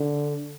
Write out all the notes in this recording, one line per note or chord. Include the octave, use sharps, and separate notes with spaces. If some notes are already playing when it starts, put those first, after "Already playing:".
Already playing: D3